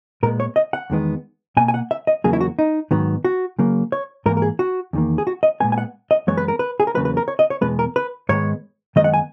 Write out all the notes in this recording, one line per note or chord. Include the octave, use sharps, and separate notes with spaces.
A#2 G#3 B3 A#4
C#5
D#5
F#5
E2 D#3 G#3 B3
B2 A#3 G#5
G#5
F#5
E5
D#5
E2 C#3 F#3 A#3 G#4
E4
F#4
D#4
G#2 D#3 F#3 B3
F#4
C#3 F#3 A#3
C#5
G#2 E3 A#3 A#4
A#4
G#4
F#4
E2 D#3 A#3
G#4
F#4
D#5
A#2 G#3 B3 G#5
G#5
F#5
D#5
F#2 E3 G#3 B3 C#5
B4
A#4
B4
G#4
A#4
E2 C#3 F#3 A#3 B4
B4
A#4
C#5
D#5
C#5
E2 B2 G#3 B3 B4
A#4
B4
G#2 D#3 G#3 B3 C#5
F#2 D#3 G#3 B3 D#5
F#5
G#5